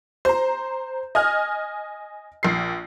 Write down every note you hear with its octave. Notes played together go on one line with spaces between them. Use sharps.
C5 A#5
D#5 G#5 F6
A#1 C7